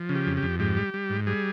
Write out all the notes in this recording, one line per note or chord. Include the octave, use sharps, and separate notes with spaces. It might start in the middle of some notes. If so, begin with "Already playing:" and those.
Already playing: F3
C#3
G4
F2
G4
F2
G#2 G4
G3
G3
G#2
G3 G#4